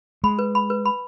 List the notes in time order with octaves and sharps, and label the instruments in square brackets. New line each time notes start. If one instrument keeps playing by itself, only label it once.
[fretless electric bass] G#3 [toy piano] B5
[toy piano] B4
B5
B4
B5